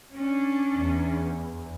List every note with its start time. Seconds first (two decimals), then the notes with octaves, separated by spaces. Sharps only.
0.13 C#4 D4
0.76 E2